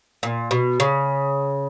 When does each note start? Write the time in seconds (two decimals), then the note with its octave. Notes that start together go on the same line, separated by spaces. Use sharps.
0.23 A#2
0.51 B2
0.80 C#3